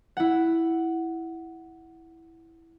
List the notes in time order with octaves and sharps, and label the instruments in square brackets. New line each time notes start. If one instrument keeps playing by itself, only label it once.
[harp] E4 F#5